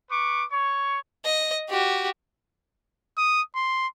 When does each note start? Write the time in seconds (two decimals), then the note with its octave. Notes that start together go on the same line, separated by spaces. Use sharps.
0.10 B4 C#6 D6
0.51 C#5 C#6
1.25 D#5
1.69 F#4 G4
3.18 D#6
3.55 C6